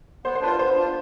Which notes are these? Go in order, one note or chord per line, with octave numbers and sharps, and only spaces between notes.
B3 C5
C5
D4 F4 B4 C5
B3 C5
D4 F4